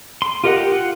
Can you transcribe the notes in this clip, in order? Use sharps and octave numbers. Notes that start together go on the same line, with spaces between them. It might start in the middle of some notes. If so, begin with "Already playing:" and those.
C6
F4 G4 A#4 D#5 F#5
G4
F4 F#5